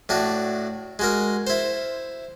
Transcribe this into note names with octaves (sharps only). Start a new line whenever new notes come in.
A2 D4 F#4
G#3 F#4 A#4
E4 C5